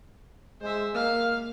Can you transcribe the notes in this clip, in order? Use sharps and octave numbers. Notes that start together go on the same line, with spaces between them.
G#3 C5 E5
A#3 F5 F6